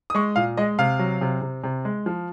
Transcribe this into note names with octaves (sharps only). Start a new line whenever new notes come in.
D#6
G#3 C#6
A#2 F5
G#3 D#5
C3 F5
F#3
C3
C3
C3
G#3
F3